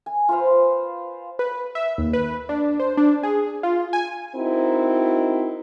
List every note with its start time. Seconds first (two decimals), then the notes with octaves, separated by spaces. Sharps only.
0.06 G#5
0.29 F4 B4 C5 F5
1.39 B4
1.75 E5
1.98 D#2
2.13 B4
2.49 D4
2.80 C5
2.97 D4
3.23 G#4
3.63 F4
3.93 G#5
4.35 C4 D#4 E4 F#4 A#4 C5